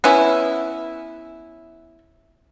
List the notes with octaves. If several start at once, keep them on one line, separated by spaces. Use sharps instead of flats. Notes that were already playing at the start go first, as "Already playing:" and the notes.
B3 C#4 E4